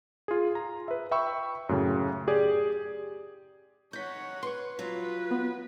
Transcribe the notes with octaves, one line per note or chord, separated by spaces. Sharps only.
F4 G#4
A#5
B4 E5
E5 G5 B5 C#6 E6
F#2 A2 C#3
G4 G#4 D5
D#4 C#5 F#5 G6 B6
B4 C6 C#6
F#3 F4 B4
B3